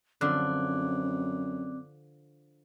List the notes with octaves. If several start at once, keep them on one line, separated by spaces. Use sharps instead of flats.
F#2 D3 F3 C4 D5 D6 F#6